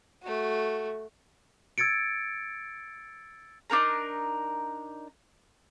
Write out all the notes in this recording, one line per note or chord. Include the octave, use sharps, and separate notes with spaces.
A3 F#4
E6 G#6 A6 C#7 D7
D4 D#4 A#4 A#5